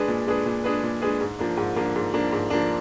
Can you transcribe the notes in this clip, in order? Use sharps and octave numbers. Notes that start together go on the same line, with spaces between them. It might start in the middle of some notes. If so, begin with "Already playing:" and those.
Already playing: G#3 D4 G#4 B4
A#2
G#3 D4 G#4 B4
A#2
G#3 D4 G#4 B4
A#2
G#3 D4 G#4 B4
G#2
F3 A#3 D4
G#2
F3 A#3 D4
G#2
F3 A#3 D4
G#2
F3 A#3 D4